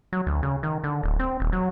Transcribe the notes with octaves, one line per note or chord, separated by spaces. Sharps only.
F#3
D2
C#3
D#3
D3
D1
C4
D#1
F#3